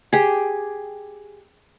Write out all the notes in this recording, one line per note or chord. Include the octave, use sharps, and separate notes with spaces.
G4 G#4